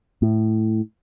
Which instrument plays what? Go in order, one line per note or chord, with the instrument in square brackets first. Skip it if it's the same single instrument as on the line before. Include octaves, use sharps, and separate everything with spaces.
[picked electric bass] A2